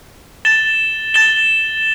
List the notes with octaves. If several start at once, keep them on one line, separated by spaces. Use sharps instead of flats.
A6 E7 G7
A6 E7 G7